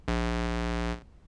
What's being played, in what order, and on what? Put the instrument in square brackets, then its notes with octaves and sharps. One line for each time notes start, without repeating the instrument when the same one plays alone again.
[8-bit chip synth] A#1